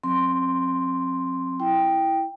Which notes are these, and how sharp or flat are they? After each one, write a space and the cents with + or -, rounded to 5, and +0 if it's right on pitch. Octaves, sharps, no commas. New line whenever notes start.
F#3 -40 C4 +25 C6 +0
E4 +0 G5 +0